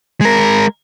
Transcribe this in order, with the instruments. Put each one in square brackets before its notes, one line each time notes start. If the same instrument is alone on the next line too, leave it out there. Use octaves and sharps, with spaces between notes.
[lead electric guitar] G#3 A#4